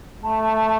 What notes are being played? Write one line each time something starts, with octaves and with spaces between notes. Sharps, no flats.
A3 A5